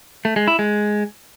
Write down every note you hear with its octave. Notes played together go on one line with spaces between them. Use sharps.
A3
G#3
E4
G#3